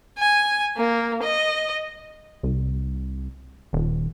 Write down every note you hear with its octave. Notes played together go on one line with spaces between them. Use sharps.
G#5
A#3
D#5
C2
D#1